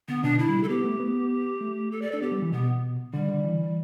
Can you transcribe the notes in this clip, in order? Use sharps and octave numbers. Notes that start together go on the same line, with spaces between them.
D3 B3
B2 D4
D3 E4
G3
G3
A4
B3 G4
A3
B3
A3
A4
D5
D4 A4
B3 G4
G3
E3
B2 B3
D3 G3
D3
E3